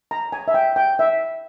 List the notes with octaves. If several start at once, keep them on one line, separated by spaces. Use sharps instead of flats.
A#5
G#5
E5
G5
G5
E5